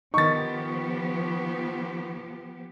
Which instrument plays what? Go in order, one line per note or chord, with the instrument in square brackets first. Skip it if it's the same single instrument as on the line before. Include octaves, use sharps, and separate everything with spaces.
[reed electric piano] D#3 D#4 [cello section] F3 B3 G4 [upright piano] C#6 A6